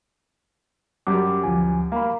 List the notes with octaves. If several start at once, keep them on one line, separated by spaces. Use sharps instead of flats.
F#2 G3 D6
D2 F3 G#5
A#3 F5 B5